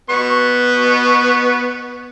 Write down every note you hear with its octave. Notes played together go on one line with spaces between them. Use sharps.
B3 C#6